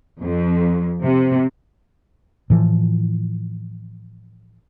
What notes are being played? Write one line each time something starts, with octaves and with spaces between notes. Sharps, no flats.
F2
C3
A2 E3 F3